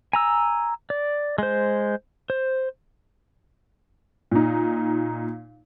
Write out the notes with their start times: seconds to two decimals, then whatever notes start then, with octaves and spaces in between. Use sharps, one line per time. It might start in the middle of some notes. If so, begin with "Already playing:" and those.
0.13 G#5 A#5 E6
0.90 D5
1.38 G#3 C5
2.30 C5
4.32 A#2 D#4